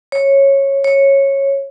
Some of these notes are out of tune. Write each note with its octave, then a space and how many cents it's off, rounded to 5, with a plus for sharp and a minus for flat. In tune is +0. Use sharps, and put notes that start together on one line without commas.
C#5 -15
C#5 -15